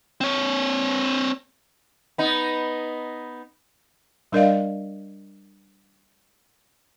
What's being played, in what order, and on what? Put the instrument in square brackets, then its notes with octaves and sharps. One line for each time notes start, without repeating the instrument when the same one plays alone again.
[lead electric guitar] C4 C#5
[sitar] B3 D#4
[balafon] G3 D4 A#4 D5 D#5 F5